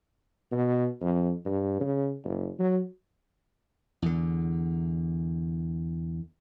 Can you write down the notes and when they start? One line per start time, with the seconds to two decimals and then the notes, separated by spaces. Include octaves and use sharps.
0.52 B2
1.01 F2
1.46 G2
1.80 C#3
2.24 F#1
2.59 F#3
4.02 E2 D3